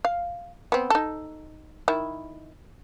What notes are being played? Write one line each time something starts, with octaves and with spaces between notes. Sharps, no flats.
F5
B3 C4
D#4 A4
D#3 E4